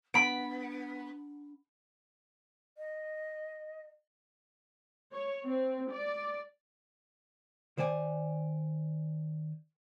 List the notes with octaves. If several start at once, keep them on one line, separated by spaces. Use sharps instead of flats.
B3 D4 B5 D7
D#5
C#5
C4
D5
D#3 C5 D5 G#5